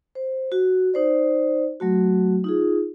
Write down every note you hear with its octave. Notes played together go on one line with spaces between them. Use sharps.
C5
F#4
D#4 C5 D5
F#3 A3 F#4
D#4 F4 G#4